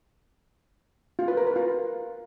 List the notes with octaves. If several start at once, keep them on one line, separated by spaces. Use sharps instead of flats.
F4
B4
A#4
B4
F4